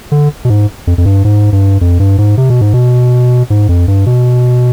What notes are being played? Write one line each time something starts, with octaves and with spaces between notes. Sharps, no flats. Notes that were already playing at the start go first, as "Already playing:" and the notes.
D3
B2
G#2
F2
F2
G2
G#2
G2
F2
G2
G#2
C3
B2
G#2
B2
G#2
F2
G2
B2